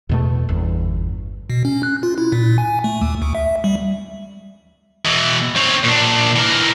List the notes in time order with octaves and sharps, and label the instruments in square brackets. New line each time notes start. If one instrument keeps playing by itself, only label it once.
[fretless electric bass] E2 B2 A3
G1 E2
[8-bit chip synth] B2
C#4
F#6
F4
E4
A#2
G#5
A3
D#2
D2
E5
G3
[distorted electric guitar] B2 E3
C4 C#5
A#2 D4
E3 A#4